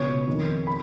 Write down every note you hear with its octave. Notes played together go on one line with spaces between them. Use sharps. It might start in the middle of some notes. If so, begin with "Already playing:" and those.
Already playing: C#2 B2 C#5 C#6
F2 D#3
B5